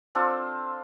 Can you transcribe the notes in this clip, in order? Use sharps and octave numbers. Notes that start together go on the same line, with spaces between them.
C4 D4 F4 A4